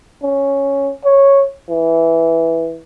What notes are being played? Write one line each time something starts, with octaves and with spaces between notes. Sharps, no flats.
C#4
C#5
E3